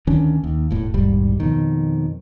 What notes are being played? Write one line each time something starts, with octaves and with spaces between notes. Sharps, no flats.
D2 D#3 C#4 D4
D#2
E1 A2
D#1 A#1 G#2 G3
F2 B2 D#3